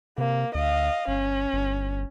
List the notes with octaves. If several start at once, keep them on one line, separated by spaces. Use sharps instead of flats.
C3 A#3
D2 D#5 F5
G1 C#4
G1